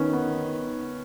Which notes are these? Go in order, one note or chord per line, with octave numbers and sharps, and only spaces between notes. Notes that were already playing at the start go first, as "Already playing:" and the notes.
Already playing: D#3 B3 C#4
B3